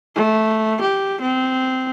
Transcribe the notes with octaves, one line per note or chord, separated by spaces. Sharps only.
A3
G4
C4